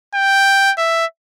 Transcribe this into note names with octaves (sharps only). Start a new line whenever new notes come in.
G5
E5